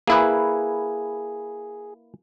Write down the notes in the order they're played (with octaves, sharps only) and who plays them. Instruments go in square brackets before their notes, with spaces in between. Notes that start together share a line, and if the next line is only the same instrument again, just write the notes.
[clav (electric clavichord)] A#3 E4 B4 [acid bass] G#4